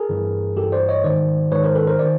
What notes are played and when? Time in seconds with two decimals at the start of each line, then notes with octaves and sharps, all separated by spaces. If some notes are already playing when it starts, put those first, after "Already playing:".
Already playing: G#4 A#4
0.09 G2 E3
0.57 G2 E3 G4 A4
0.72 C5 D5
0.89 C#5 D#5
1.04 G#2 D#3 C5 D5
1.52 G#2 D#3 B4 C#5
1.64 A#4 C5
1.75 A4 B4
1.87 A#4 C5
1.99 D#3 C5 D5